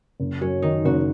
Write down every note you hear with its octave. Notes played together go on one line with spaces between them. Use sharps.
F#1
F#2 C#4
D#3 D#4
F#1 F#4